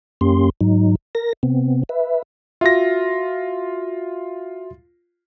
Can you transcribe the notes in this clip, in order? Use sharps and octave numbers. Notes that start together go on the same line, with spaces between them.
F#2 A#3 C#4 G4 C6
G#2 F#3 D#4
A#4 A#6
C3 B3 C4
B4 E5
F4 F#4 E5 A#6